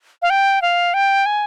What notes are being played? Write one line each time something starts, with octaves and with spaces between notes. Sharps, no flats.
F5
G5
F5
G5
G#5